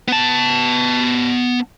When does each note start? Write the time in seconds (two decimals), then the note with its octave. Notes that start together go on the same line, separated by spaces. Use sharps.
0.08 B3 A5